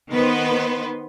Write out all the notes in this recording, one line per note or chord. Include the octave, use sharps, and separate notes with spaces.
D#3 B3 B4 C5